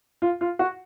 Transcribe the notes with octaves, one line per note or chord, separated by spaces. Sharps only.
F4
F4
F#4